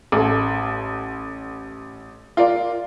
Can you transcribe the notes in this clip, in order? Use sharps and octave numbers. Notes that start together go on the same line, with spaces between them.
A1 A3
F4 A#4 D5